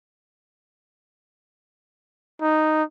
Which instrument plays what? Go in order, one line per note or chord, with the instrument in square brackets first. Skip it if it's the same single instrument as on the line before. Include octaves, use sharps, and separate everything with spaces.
[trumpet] D#4